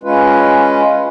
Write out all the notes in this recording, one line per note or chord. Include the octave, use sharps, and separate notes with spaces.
G#3 C#4 F4 B4